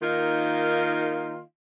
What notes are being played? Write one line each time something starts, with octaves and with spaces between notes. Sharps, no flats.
D#3 A#3 D#4 F4